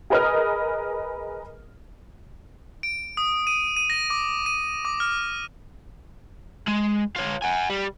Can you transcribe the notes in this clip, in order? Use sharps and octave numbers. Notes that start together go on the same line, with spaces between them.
G#4 A#4 B4 D#5 D#6 F6
D7
D#6
D#7
D#7
A#6
D6
D#7
D6
F6
G#3
F4 C#5
F#5 G#5
G3